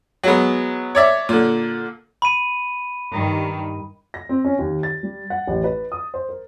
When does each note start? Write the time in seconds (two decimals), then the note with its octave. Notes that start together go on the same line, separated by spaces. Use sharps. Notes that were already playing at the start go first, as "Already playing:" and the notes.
0.23 F#3 G#3 B3
0.95 C#5 D5 E5
1.29 A#2 D3
2.22 B5 D#7
3.12 G2 D#3
4.14 A#6
4.29 C4
4.45 C#4
4.59 D#2
4.83 A6
5.03 G3
5.30 F#5
5.47 A1
5.64 B4
5.92 D#6
6.14 C5
6.29 A#4